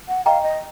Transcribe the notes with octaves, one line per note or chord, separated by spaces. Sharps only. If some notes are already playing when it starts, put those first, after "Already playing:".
F#5
D#5 F5 G5 A#5 C#6
D#5